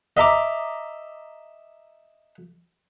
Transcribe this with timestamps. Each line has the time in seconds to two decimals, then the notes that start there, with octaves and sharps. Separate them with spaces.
0.17 D#5 E5 A#5 D6